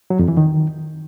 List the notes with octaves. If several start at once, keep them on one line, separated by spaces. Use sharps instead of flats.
F#3
F2
E3
D#3